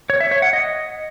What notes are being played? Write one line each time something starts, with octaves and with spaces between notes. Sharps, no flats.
C#5
E5
C#5
F#5
D#5